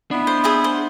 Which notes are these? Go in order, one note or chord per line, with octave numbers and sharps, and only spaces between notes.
B3 D4 E4
C5
G#4 C5 E5
C5